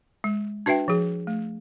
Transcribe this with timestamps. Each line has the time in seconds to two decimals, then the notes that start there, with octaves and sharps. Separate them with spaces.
0.24 G#3
0.66 D4 F#4 B4 E5 G5
0.88 F3 G#4
1.27 A3